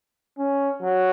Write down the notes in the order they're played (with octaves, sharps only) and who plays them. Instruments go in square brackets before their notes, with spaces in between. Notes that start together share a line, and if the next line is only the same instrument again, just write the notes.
[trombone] C#4
F#3